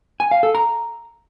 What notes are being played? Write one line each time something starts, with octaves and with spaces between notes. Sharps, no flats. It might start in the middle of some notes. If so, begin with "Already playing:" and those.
G#5
F5
A4
A#5